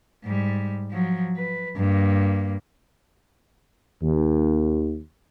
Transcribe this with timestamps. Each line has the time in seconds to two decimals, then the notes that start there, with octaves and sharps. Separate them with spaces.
0.24 G#2 G3
0.91 F3 F#3
1.37 B4
1.77 G2 A#3
4.03 D#2